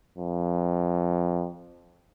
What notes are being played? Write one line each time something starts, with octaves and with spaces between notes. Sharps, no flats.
F2